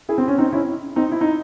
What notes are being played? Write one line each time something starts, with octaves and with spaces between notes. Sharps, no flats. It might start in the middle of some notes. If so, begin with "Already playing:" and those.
E4 G#4
C4
C#4
C4 D#4
C#4 E4
C4 D#4
E4
D#4